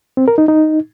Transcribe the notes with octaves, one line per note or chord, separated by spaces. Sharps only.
C4
A#4
D#4
D#4